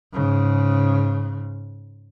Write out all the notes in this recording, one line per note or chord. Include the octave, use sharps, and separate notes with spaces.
G#2 C#3